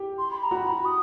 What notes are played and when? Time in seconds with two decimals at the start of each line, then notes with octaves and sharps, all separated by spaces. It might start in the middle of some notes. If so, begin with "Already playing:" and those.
Already playing: G4
0.18 C6
0.31 B5
0.43 A#5
0.51 F#4 B5
0.85 D#6